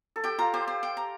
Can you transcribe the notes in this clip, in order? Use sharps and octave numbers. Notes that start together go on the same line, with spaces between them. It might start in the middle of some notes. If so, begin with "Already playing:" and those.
A4
G4 G5
F4 A#5
G4 C5
C5
G5
A#5